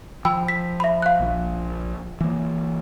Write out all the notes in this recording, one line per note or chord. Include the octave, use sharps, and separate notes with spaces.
F3 G5 B5 E6
B6
E5 B5
F5 F#6
A#1 F3
E3 A#3